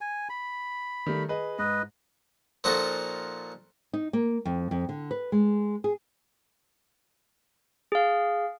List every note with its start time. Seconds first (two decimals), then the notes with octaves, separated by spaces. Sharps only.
0.01 G#5
0.29 B5
1.06 D#3 G3 A3
1.29 G#4 B4 D#5
1.59 G#2 B4 D#5
2.64 A#2 F3 D#4 F#4 A4
3.93 D#4
4.13 A#3
4.45 F2
4.71 F2
4.89 D3
5.11 B4
5.32 G#3
5.84 G#4
7.92 G#4 F5